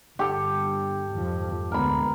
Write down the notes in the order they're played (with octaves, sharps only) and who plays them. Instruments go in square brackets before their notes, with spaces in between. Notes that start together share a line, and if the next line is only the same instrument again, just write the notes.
[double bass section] G1 G2 [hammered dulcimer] G4 A4
[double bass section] G#1 F2 F3
[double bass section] D2 G#3 B3 [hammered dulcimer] A#4 B5